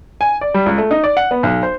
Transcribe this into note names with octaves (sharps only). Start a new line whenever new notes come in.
G#5
D5
G3
C#2
A3
D#4
D5
F#5
B3
B1
C5